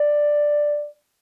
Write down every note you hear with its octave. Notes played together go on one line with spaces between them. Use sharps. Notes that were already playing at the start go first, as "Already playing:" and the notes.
Already playing: D5